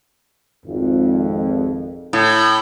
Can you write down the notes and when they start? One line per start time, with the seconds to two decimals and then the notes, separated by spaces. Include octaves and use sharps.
0.66 G#1 F2
2.13 A2